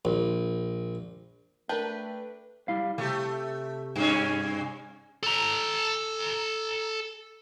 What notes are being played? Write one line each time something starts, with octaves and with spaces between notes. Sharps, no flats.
A#1
A3 D4 A#4 B4 G5 G6
G3 E4 F5
C3 A3 G4
G2 C#4
A4 A#5